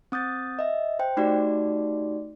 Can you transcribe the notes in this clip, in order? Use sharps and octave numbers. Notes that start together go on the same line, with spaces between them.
C4 D#6 G6 A6
D#5 E5
C5 G5
A3 D#4 F#4 G4 D5